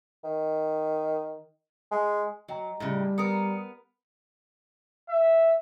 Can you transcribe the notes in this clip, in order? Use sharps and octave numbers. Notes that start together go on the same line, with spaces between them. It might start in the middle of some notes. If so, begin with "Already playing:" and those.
D#3
G#3
F#3 D#5 G5 A#5
A2 C#3 G3
B3 A#4 A#5 D#6 C#7
E5